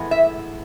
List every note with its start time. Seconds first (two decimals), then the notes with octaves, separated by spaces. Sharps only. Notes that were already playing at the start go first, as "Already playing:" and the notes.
Already playing: A2 E3 G#3 B3
0.11 E5